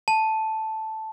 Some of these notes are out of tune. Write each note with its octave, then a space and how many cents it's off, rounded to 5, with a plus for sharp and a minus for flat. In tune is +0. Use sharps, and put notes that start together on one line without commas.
A5 -5